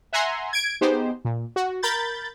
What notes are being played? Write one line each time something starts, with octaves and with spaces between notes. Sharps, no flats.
E5 F#5 G#5 A#5 C6
G#6 D7
B3 D#4 G4 G#4 C5
A#2
F#4
A#4 B5 G6 A6